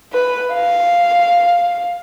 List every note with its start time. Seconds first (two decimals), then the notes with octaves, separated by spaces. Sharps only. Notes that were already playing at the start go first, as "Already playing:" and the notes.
0.13 B4
0.53 F5